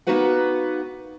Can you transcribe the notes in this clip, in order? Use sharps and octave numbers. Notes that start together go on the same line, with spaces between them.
A#3 B3 D#4 F#4 B4 F#5